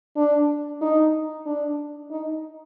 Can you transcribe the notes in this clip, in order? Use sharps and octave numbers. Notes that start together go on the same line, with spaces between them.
D4
D#4
D4
D#4